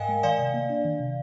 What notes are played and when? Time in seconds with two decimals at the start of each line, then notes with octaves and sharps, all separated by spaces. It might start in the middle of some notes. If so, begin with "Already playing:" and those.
Already playing: G#2 A#4 D#5 F5 G5 G#5
0.09 G#3
0.23 D#3 D5 F5
0.39 C3
0.54 A#3
0.70 D4
0.85 D#3
1.00 C3